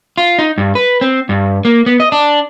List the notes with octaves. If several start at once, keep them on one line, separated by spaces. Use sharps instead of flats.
F4
D#4
G2
B4
C4
G2
A#3
B3
D#5
D4